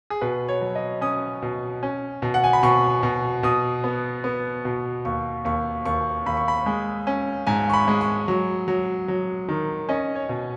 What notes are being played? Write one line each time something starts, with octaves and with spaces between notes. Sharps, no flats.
G#4
B2 B4
C#5
F#3
D#5
C#4 D#6
B2
C#4
B2
F#5
G#5
B5
B2 C#6
B2
B2 D#6
B3
B3
B2
D#2 C#6
D#2 C#6
D#2 C#6
D#2 B5
C#6
B5
G#3
C#4
G#2 G#5
C#6
B5
G#3
C#6
F#3
F#3
F#3
D#3
C#4 D#5
C#5
B2